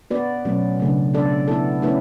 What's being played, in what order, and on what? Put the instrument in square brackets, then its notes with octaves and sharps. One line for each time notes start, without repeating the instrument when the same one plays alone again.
[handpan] B3 F#4 B4 D5
B2 F#3 A3 C#4
C#3 F#3 A3 D4
B3 D4 A4 D5
B3 E4 A4
A3 C#4 E4 B4